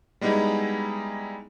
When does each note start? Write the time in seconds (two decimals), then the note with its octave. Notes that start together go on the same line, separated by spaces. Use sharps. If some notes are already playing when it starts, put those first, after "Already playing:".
0.21 G3 G#3 B3 D#4 E4